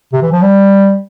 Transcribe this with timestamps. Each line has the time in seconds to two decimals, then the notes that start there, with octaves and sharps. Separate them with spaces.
0.13 C3
0.23 E3
0.32 F3
0.42 G3